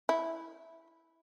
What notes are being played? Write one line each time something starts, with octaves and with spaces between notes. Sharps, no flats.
E4